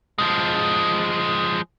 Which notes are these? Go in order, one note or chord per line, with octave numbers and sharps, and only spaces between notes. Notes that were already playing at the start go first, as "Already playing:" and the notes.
F3 G#3